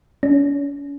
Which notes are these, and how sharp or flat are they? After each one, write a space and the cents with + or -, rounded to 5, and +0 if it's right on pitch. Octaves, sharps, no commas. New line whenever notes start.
C#4 +40